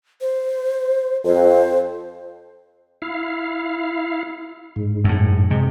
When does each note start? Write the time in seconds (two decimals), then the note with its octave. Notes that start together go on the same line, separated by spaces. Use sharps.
0.21 C5
1.24 F2 C5
3.02 E4 F5
4.76 G#2
5.04 F#2 A2
5.50 C3 G#3